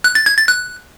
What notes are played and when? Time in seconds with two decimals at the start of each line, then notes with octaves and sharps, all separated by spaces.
0.04 F#6
0.15 A6
0.26 G#6
0.37 A6
0.48 F#6